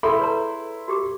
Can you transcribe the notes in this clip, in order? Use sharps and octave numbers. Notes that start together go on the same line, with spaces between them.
E4 G#4 A4 B5 C6
B4 C#5 A#5
F#4 G4 D6